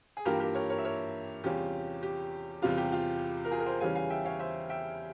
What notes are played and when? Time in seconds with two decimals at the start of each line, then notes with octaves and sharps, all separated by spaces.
0.17 G#4
0.25 G2 E3 A#3 F4 G4 A#4
0.40 G4 A#4
0.55 A#4 C#5
0.70 A#4 C#5
0.78 E5
0.85 A#4 C#5
1.44 E2 C3 G3 C#4 F4 G4
2.03 G4
2.62 E2 C3 G3 F4
2.77 G4
2.92 F4
3.45 A#4
3.51 F4 G#4
3.60 A#4
3.66 G#4 C5
3.80 E2 C#3 E3 G3 C#4 F5 G#5
3.95 F5 G#5
4.10 E5 G5
4.25 C#5 F5
4.40 C5 E5
4.70 E5 G5